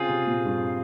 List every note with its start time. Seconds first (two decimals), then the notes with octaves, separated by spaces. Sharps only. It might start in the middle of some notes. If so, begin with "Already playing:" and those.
Already playing: C#3 C4 F4 G#4
0.09 C3
0.27 A#2
0.45 G2